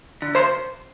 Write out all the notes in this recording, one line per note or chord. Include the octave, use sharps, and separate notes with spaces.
D3
C5 C6